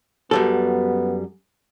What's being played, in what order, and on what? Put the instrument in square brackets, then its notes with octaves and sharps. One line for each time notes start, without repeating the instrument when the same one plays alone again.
[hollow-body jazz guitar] F#2 G3 A4 [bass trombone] B3